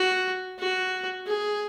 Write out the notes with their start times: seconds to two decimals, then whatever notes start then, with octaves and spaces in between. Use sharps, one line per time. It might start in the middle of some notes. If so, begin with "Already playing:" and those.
Already playing: F#4
0.59 F#4
1.27 G#4